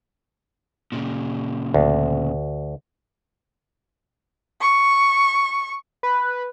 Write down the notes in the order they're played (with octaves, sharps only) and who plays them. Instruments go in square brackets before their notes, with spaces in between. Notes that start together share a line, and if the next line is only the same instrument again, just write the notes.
[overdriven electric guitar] A#2 C#3
[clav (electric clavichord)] D2
[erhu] C#6
[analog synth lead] B4